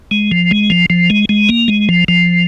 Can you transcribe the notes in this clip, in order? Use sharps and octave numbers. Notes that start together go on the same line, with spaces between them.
G#3
F3
G#3
F3
F3
G#3
G#3
A#3
G#3
F3
F3